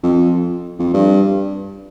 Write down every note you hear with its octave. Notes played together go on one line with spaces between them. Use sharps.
F2
F2
G2